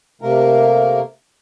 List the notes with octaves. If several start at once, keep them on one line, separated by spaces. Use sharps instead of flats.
C3 A3 A#3 A#4